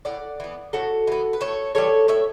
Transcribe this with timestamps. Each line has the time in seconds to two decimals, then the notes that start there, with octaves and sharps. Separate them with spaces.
0.05 A2 D5 F#5
0.40 E3 B3
0.73 A2 F#4 A4
1.07 E3 B3
1.33 B4
1.41 A2 A4 C#5
1.75 E3 G3 A4 C#5
2.08 A2 C#5 E5